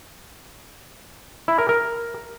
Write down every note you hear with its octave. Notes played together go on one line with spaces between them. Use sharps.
E4
A#4
A#4